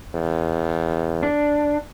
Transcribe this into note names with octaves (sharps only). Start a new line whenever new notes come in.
E2
D4